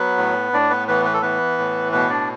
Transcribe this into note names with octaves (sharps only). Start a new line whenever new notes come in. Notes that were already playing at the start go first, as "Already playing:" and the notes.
Already playing: F#3 B3 B4
A2
A2 D4 D5
B3 B4
E3 B3 B4
B4
A4
E3 B3 B4
A2
B2 B3 B4
D4 D5